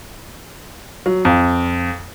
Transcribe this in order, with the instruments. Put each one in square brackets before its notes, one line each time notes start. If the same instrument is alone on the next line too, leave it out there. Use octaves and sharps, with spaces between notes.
[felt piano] F#3
F2